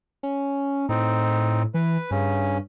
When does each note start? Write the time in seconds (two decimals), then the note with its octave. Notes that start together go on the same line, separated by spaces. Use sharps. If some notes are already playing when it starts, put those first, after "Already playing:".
0.23 C#4
0.89 A2 C4 D#4
1.74 E3 B4
2.11 G2 C#3 C#4